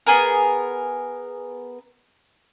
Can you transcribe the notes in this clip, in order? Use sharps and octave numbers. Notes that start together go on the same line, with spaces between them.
B3 G#4 A#4